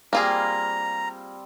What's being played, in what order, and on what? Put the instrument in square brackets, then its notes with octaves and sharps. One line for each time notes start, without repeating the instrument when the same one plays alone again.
[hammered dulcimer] G3 C4 C6 [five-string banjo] A#3 F4 G#4 [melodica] A#5